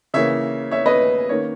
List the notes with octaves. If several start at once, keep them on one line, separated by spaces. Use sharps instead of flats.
C#3 E3 A#3 C#5 E5
C#5 E5
B4 D#5
D#3 A#3 C#4 C#5